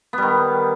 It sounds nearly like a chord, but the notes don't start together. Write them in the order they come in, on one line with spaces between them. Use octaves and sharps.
B3 G3 D#3